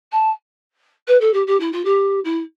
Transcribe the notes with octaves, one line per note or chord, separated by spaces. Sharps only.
A5
B4
A4
G4
G4
E4
F4
G4
E4